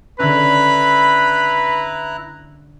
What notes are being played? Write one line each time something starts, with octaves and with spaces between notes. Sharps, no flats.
D3 C#4 E4 B4 A#5 B5 F#6